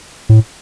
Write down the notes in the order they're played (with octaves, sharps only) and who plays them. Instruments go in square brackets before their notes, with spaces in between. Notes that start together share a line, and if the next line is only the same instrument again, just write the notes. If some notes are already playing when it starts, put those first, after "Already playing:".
[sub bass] A2